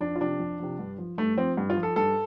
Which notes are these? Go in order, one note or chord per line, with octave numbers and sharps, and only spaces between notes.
F2 D4
F4
C3 F3 D4
F2
C3 F3
G2
F3
G2 A3
F3 C4
G2
F4
F3
A4
G2 A4